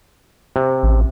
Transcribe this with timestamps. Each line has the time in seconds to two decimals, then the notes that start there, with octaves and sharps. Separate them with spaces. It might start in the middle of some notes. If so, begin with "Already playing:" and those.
0.56 C3
0.83 A1